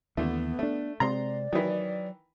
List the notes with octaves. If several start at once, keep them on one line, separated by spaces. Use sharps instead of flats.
D#2 D3 E3 A3 B3
A3 C4 D4
C3 G#3 C4 D5 A#5 C6
D#3 E3 F#3